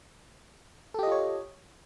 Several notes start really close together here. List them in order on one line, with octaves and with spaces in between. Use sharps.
A4 G4 D#5 F4 C#5